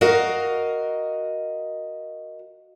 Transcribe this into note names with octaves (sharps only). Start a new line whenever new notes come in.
F#4 A#4 D#5 F5